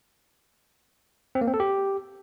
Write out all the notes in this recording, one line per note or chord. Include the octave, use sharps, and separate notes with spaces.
C4
A#3
C4
A4
G4